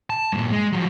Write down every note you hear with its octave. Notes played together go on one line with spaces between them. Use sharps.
A5
G2 A#2
G#3
F3 F#3